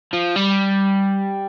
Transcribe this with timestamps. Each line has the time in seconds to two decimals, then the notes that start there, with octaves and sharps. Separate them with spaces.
0.13 F3
0.36 G3